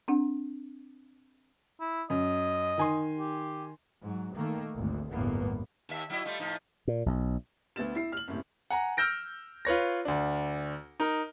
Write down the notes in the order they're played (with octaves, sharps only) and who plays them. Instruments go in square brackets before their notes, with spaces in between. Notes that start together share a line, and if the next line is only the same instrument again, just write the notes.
[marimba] C4 D4 F#5
[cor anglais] E4
[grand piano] F#2 [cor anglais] D#5
[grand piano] D#3 G#5 C6
[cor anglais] G4
[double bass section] G#2 F#3
D#3 A3 A#3
G#1 D2
G1 E2 A2 A#3 B3
[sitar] D#2 E5
F#3 E4 D#5
G3 A3 F4
A2 F3 D#4
[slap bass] A#2
B1
[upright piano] D2 B3 A6 E7
E4 C7
F6 F#7
F#1 A2 C3
[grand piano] F#5 G#5 A#5
E6 F6 G6 A#6 D7
F4 B4 C#5 A#6
D2 D4
D#4 A#4